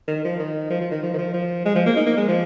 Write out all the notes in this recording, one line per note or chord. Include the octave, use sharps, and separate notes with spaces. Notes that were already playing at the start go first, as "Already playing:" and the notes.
D#3
F3
D#3
F3
F3
D#3
F3
D#3
F3
F3
G#3
F3
A#3
D#4
A#3
G#3
F3